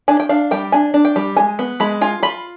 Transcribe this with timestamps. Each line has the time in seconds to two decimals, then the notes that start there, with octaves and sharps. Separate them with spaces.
0.08 D4 G#5
0.20 G5
0.29 D4 F5
0.51 G3 G5
0.72 D4 G#5
0.94 D4
1.05 G5
1.16 G3
1.37 G#3 G#5
1.59 B3
1.80 G#3 B5
2.01 F4 G#5
2.23 F4 B5